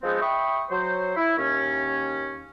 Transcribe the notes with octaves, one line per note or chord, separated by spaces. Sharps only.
F3 G#3 B3 C4 D#4
E5 G5 B5 C#6 D#6
F#3 C5
E4
D#2 C#4